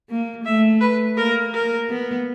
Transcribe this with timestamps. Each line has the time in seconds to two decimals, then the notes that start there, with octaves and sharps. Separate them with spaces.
0.09 A#3
0.45 A3 E5
0.81 B4
1.17 A#3 A#4
1.54 A#4
1.90 B3